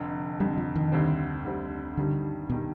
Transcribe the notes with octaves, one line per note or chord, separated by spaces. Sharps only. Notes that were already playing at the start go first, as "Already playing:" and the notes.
Already playing: F1 F2 D3
F1 F2 D3 G3
F3
D#3
D2 D3 G3 C4
D2 D3 G3 C4
G2 D3 D#3 G3
B2 D#3 G3